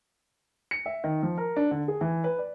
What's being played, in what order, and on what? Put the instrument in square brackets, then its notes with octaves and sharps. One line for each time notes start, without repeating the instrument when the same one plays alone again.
[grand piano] C#7
E5
D#3
F3
A#4
D4
D3
G#4
E3
B4
D5